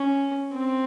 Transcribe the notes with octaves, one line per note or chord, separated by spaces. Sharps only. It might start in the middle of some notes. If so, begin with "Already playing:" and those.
Already playing: C#4
C4